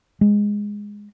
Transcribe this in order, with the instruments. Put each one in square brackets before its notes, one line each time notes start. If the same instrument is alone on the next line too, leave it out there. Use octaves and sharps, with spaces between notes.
[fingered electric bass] G#3